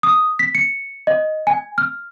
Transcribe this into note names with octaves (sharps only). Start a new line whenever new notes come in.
D#6
B6
C#7
D#5
G#5
F6